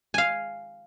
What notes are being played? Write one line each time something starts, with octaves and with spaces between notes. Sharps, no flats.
F5 G#5